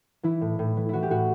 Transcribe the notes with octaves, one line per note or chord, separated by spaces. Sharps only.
E3 E4
A2
A2
E3
E3 E4 F#4
G4
A2 F#4